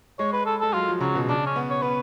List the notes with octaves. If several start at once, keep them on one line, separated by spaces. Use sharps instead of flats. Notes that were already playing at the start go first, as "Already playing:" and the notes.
G#3 C#5
B4
A4
G#3 A4
F#3 F4
F3
C#3 F#3
B2
C#3 D4
C#4
B3
C#5
B3 B4